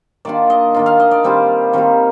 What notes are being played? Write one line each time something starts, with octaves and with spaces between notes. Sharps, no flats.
D#3 A#3 D4 F4 D5
D#5
D#3 A#3 D4 F4
F5
D#5
D5
D#3 G3 C4 F4
D#3 G3 C4 F4